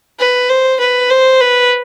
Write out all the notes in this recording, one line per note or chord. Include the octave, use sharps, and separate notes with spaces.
B4
C5
B4
C5
B4